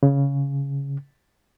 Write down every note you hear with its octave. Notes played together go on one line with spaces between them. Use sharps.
C#3